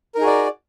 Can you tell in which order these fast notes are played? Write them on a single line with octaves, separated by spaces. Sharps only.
A#4 D#4 G#4 F#4 D5